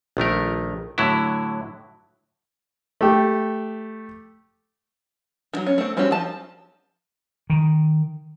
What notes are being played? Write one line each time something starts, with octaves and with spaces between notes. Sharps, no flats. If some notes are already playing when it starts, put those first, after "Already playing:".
A#1 D#3 A3 A#4
A2 D3 F#3 E4
A3 G4
D#3 F#3
C#4
A3 C4
G3 C4 C#4 F#4 G4
F3 A5
D#3